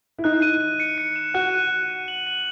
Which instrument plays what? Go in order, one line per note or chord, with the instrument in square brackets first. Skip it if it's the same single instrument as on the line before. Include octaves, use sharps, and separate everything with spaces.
[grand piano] E4
[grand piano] D#4 [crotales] F#6
[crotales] D#7
D#7
C#7
C#7
E7
[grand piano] F#4 [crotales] F#6
[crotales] D#7
F#6
D#7
F#7
F#7